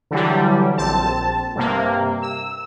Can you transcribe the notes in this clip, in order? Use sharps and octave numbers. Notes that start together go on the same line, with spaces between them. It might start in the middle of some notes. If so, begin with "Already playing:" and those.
D3 E3 F#3 G3
A#1 C4 A5
G2 C3 A#3
E6